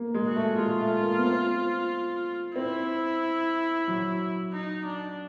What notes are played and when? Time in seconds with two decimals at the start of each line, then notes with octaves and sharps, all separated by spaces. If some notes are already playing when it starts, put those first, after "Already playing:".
Already playing: A#3
0.14 G#3
0.26 F#4
0.36 A3
0.58 G#3 F4
0.81 A3
1.02 A#3
1.17 B3
1.24 C4
2.55 C4 E4
3.88 F#3
4.53 D#4
4.85 D4